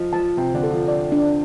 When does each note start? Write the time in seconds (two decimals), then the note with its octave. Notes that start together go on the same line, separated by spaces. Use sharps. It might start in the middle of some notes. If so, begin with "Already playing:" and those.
Already playing: F3 D#5
0.13 F3 A5
0.37 C3 C4 C5
0.54 D3 D4
0.63 A4
0.71 F3 F4
0.88 D5
1.12 D4